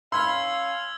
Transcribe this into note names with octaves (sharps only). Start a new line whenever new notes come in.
C#4 F5 B5 C6 E6 G#6 G7